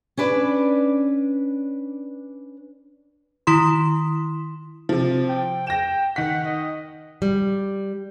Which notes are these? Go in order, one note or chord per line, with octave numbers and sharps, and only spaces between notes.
C#4 D4 B4 D5
D#3 E4 C6
C3 F3
G5
G5 A#6 E7
D#3 F#5 B6
D#5
G3